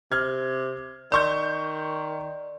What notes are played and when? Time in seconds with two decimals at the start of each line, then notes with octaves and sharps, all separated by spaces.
0.12 C3 F6 G#6
1.12 D#3 D5 C6 C#6 G6